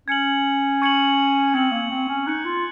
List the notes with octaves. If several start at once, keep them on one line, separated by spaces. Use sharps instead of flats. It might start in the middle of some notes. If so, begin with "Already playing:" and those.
C#4 G#6 C#7 F#7
C#6 G#6 C#7 F#7
C4 G#6 C#7 F#7
A#3
C4
C#4
D#4 C#6 F#6 C#7
F4